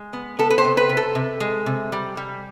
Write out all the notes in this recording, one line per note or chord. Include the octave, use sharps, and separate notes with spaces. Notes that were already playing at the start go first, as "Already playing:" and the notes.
Already playing: G#3
B3
B3 A4
B4
C5
C3
B4
C3
A4
C3
G#3
C3
G3
G3